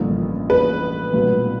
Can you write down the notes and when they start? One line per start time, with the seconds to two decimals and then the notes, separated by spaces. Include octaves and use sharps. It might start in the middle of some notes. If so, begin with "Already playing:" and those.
Already playing: A1 G2 D3 F3 A#3
0.50 B4
1.14 B1 A#2 G3 B3